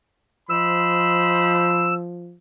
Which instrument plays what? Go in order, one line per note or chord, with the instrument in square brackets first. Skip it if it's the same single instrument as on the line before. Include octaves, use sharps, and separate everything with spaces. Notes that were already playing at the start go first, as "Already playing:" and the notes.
[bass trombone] F3 [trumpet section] C5 D#5 B5 [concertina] E6